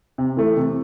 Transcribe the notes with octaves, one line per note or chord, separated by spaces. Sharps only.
C3
E3 A3
C3